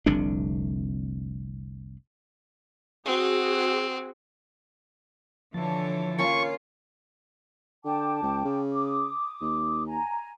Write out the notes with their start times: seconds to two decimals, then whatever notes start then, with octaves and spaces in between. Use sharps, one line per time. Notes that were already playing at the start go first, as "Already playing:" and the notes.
0.06 F1 C2 D3 D4
3.05 C4 F#4 G#4
5.54 D3 E3 F3 C#5 A5
6.19 A#3 C#4 F4 A#4 C#6
7.85 D3 G5 A5 D6
8.23 C#2
8.45 C#3
8.73 D6 D#6
9.41 D#2
9.86 G#5 A#5